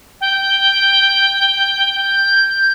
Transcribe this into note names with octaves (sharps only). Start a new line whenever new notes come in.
G5
G6